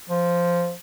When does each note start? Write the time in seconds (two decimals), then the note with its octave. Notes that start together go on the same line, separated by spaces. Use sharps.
0.09 F3